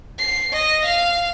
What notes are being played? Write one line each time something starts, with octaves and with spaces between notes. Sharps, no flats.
C7
D#5
F5